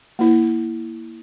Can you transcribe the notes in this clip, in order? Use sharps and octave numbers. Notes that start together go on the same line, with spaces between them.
A#3 E4